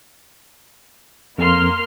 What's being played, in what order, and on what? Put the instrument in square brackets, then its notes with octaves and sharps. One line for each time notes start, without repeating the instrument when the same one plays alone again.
[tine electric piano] F2 [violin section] A#3 C6 F6